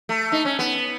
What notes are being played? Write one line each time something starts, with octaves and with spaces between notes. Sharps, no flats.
A3
D#4
C#4
B3